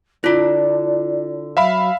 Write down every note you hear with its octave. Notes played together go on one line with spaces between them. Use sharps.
D3 D4 E4 F4 D5
F#3 E5 F5 B5